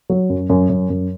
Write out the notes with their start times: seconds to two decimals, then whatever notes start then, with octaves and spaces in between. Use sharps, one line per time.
0.10 F#3
0.30 F#2
0.50 F#2
0.70 F#2
0.90 F#2